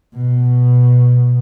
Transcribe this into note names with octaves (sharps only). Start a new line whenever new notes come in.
B2